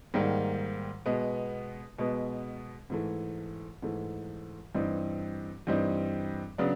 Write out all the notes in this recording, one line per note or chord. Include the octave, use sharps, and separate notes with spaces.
G#2 D#3 G3 A#3
B2 G#3 B3
B2 G#3 B3
G#2 E3 A3
G#2 E3 A3
G2 E3 G3 C4 D#4
G2 E3 G3 C4 D#4
C#3 F#3 B3 D4